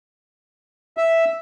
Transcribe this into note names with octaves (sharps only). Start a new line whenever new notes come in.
E5